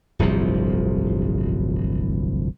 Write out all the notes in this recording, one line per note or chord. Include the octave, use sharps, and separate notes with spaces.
D1 G1 C2 F3